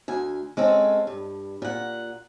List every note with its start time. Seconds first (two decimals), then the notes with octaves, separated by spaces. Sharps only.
0.08 D2 G#5
0.57 G#3 C4 C#4 A4
1.07 G2
1.62 A#2 F#5